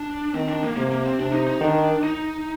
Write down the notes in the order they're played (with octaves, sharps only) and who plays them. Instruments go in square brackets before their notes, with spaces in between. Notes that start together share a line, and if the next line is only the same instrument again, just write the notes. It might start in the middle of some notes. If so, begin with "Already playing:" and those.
Already playing: [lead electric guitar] D4
[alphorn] D#3 [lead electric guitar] C4
[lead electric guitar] D4
A#3
[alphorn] C3 [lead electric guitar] A#3
[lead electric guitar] A#3
C4
[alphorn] C3 [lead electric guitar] D4
[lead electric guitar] D#4
D#4
[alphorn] D#3 [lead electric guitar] D4
[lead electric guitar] D#4